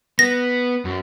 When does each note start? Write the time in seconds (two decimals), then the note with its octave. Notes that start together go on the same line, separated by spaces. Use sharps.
0.19 B3 A#6
0.85 F#2